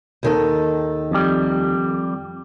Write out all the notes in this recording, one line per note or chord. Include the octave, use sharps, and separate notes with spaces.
D#2 D#3 A4
F2 G3